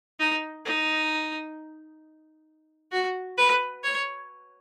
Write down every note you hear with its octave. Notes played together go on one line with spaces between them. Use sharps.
D#4
D#4
F#4
B4
C#5